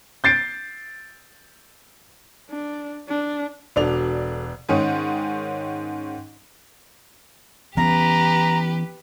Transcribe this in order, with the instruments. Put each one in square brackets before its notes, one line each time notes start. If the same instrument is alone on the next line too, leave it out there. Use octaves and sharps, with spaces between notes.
[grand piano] G6 A6 C7 D7
[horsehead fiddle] D4
D4
[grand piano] E1 D4 F7 [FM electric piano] F#4 A4 D5
[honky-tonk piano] G#2 D#3 C#4 D#4
[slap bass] E3 B3 C#4 [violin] G4 B4 [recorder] A#5